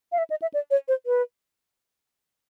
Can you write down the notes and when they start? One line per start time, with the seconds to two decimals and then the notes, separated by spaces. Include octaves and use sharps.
0.12 F5
0.18 E5
0.30 D#5
0.42 E5
0.54 D5
0.71 C#5
0.88 C5
1.06 B4